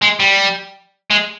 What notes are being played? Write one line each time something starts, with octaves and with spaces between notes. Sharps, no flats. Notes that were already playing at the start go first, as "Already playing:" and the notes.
G#3
G3
G#3